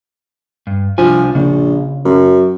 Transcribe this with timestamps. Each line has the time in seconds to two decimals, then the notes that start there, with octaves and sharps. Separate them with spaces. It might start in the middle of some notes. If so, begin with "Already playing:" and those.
0.67 G2
0.98 C2 F3 D4 G#5
1.35 A#1 C#3
2.05 F#2